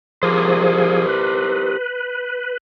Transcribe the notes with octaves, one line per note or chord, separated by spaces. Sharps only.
F3 G4 G#4 A#4 C5
B4